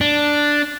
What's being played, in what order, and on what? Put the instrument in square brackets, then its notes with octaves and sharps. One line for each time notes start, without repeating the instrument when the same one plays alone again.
[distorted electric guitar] D4